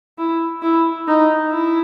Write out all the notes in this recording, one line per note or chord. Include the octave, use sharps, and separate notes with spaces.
E4
E4
D#4
E4